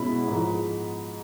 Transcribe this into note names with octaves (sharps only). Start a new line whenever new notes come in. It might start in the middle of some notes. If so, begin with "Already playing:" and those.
Already playing: B2 G#3 C#4 E4 B5
G#2 F3 G#3